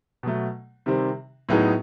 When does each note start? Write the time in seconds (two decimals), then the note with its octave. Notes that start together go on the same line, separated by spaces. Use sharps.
0.23 B2 F#3 A3
0.86 C3 D#3 G3 C4
1.49 A2 F#3 B3 D#4 G#4